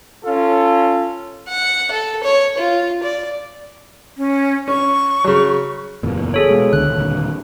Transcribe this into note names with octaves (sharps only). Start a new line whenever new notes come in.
C#4 F4 A4
F#5
A4
C#5
F4
D5
C#4
C#4 C#6
C#3 F#3
F#1 E2 A#2
G#4 A4 C#5
B2 G#3
C#2 D3 F#6
D#1 A#2 D3